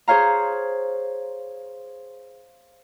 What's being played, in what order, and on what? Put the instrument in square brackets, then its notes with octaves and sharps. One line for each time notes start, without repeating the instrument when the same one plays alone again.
[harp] G#4 C5 C#5 F5 A#5